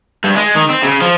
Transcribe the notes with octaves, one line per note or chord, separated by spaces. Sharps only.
G2
G#3
D#3
C4
C#3
F3